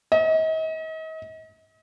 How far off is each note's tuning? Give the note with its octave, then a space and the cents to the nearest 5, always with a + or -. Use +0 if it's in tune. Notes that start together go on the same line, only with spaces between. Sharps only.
D#5 +40